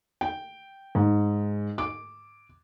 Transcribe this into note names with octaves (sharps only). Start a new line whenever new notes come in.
G5
G#2
D6